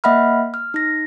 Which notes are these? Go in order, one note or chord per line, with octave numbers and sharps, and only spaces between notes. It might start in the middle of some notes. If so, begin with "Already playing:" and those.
A#3 D#5 E5 F#5 B5 F6
F6
D#4 A#6